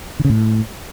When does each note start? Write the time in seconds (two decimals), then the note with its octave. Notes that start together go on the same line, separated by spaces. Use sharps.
0.19 D3
0.25 C#3
0.30 A2